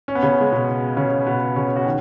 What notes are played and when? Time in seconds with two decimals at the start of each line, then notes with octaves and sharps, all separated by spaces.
0.08 C#4
0.15 B3
0.23 C#3 C#4
0.41 G#3
0.52 B2 B3
0.97 C#3 C#4
1.26 B2 B3
1.56 C#3 C#4
1.76 F#4
1.86 D#3